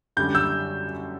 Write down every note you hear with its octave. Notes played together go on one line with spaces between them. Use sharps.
F#2 D3 G3 G6
E6 G6